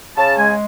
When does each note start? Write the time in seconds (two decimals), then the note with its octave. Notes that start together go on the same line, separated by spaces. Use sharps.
0.16 C#3 A5
0.36 G#3 G#5